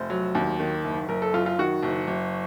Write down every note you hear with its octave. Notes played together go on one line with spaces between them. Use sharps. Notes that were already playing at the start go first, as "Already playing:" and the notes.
Already playing: F1 C5
F#3
D#2
D#3
F#1
F#1 A#4
A4
F#2 F4
F4
D#3 F#4
F#1
F#1